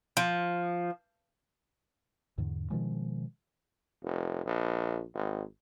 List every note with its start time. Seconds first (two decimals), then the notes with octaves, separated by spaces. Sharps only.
0.17 F3
2.38 E2 G#2 D3
2.70 B2 D#3 F3 G#3
4.03 F1
4.45 A#1
5.14 G#1